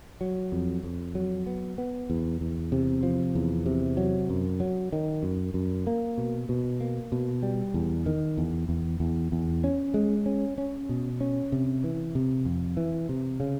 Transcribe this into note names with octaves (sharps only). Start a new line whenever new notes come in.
F#3
F2
F2
F#3
B3
B3
E2
E2
C3
F3
E2
C3
F#3
F#2
F#3
D#3
F#2
F#2
A#3
B2
B2
A#3
B2
G3
E2
D#3
E2
E2
E2
E2
C#4
G#3
C#4
C#4
B2
C#4
C3
E3
C3
F2
E3
C3
C#3